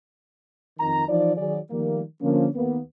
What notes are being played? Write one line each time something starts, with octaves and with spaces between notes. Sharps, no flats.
F2 D#3 A#5
E3 F3 D#4 D5
D#3 F#3 G#4 D5
D#3 F3 G3 A3 A#3
D3 F3 A#3 C#4
D#2 A#3 B3